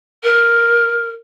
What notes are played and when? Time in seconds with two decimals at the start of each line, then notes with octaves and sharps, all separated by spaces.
0.23 A#4